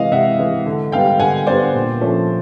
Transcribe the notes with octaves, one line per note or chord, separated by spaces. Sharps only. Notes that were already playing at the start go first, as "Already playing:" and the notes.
Already playing: C3 E3 G#3 D#5 F5
C3 E5 F#5
E3 G#3
D3
G3 B3 D4 F5 G5
D3 F#5 G#5
G3 B3 D4 C5 D5
A#2
F3 A3 C#4